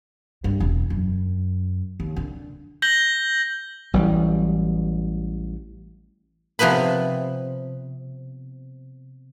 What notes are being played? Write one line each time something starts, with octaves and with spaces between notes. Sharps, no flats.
G2
E1
F#2
D#2
D3
G6 A#6 F#7 G7
A1 E3 F#3 G3
C3 F3 B3 B4 B5